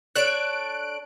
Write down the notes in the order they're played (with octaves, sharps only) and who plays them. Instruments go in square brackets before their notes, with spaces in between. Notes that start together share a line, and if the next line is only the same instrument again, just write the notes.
[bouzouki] D4 A4 C#5 [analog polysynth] F#6 D7